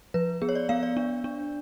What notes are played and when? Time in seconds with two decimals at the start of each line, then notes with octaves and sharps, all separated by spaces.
0.14 F3 B4
0.42 B3 G#4
0.49 C#5
0.55 D5
0.69 B3 F5
0.83 D5
0.97 D4
1.24 D4